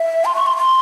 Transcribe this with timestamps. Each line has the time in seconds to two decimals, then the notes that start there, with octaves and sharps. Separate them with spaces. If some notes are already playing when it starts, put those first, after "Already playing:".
Already playing: E5
0.25 C6
0.35 C#6
0.46 C6
0.57 C6